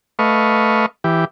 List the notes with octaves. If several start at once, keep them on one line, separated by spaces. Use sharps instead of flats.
A3 B4 D#5 F5 C#6
E3 G4